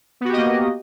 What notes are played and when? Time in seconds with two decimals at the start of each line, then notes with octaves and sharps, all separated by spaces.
0.21 B3
0.25 F#4
0.29 G4
0.33 D#5
0.37 A#3